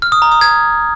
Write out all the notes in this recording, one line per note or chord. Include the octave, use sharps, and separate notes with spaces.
F6
D#6
A#5
D#6
G#6